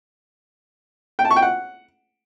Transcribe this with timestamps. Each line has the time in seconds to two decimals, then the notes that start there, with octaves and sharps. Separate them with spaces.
1.19 G5
1.25 A5
1.31 C#6
1.36 G5
1.42 F#5